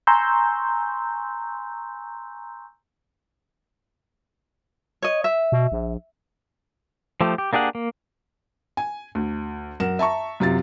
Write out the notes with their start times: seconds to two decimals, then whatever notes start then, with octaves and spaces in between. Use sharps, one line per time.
0.07 G#5 A#5 C6 C#6 E6 G6
5.02 C#5 D#5
5.24 E5
5.52 B2
5.72 A#1
7.21 F3 A3 G4
7.38 G4
7.53 A#3 D4 G4 G#4 F#5
7.75 A#3
8.77 G#5
9.15 D2
9.80 F#2 A#4 F#5 E7
9.99 E5 A5 A#5 C#6
10.40 F#2 C3 F4 A6